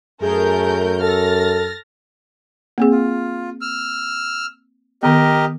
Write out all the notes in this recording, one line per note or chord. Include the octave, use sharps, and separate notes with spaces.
F#2 A3 G#4 A#4 G6
A4 F6 A6 A#6
A#3 C4 G#4
F4
E6 F6
D#3 B3 G4 A#4 D#5